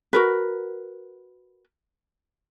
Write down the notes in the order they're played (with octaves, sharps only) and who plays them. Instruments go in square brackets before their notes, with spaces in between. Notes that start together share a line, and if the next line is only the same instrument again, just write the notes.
[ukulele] F#4 A#4 B4